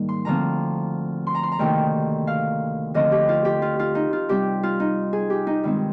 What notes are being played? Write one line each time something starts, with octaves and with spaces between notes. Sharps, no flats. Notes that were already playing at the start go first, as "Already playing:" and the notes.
Already playing: G#2 D#3 G3 A#3
C6
D2 D3 F3 C4 A#5
C6
A#5
C6
A#5
D2 C3 D#3 A#3 G5
F5
D2 D3 F3 C4 D#5
G4
F4
G4
F4
F4
D#4
F4
C3 G3 C4 G4
F4
D#4
G#4
G4
D#4
G2 D#3 G#3 C4